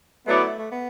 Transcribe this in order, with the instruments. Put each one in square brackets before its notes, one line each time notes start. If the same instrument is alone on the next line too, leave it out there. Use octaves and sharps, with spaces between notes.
[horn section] F#3 B3 E4 B4 D5 [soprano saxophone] A3
[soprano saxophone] A3
B3